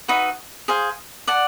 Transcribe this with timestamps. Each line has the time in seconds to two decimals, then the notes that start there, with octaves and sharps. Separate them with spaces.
0.08 D#4 F#4 B4 E5
0.68 G#4 C5 F5
1.27 D5 F#5 A5